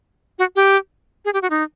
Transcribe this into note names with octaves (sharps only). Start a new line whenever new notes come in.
F#4
G4
G#4
G4
F#4
D#4